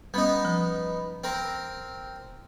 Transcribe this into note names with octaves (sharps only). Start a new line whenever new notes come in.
G3 B3 C#4 D#4
F3
C4 A#4